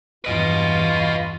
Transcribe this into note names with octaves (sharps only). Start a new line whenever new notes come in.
E2 G2 F4 B4 D#5